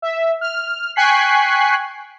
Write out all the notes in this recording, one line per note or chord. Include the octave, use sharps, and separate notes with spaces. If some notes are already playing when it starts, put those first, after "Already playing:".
E5
F6
G5 G#5 C#6 F#6 B6 C7